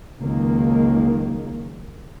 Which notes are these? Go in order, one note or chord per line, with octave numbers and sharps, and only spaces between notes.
C#2 D#3 F#3 A#3